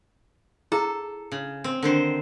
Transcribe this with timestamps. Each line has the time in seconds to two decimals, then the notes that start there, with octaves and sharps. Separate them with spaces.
0.72 E4 G#4 A4 A#5
1.32 C#3
1.64 C4
1.82 D3 D#3 C5